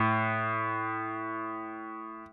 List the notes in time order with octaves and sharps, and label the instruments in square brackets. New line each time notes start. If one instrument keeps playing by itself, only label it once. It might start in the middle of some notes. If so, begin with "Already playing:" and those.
Already playing: [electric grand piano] A2